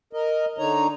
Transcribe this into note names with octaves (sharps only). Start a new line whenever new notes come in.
A#4 D#5
D3 D#4 C#5 A#5